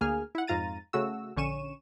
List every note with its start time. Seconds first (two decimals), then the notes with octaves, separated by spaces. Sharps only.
0.01 D2 A#3 G#4 G#5 F6
0.35 E4 F#5
0.47 F2 G#2 F4 A#5 A6 D#7
0.93 C#3 A3 F#4 E6
1.36 A#1 D3 C#4 C#6 D#7 E7